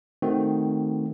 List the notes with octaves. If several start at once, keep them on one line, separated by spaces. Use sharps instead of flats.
D#3 A3 C4 F#4